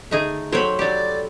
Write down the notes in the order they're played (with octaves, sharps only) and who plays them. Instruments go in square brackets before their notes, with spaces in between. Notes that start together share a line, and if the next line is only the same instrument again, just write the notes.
[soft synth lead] D3 [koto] A3 D#4 G#4
[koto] F#3 G5 [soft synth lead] A4 [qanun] C5 C#5 B5
[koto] F#3 G4 [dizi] D5